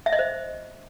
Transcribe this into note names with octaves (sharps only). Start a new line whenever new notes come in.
E5
D#5
C5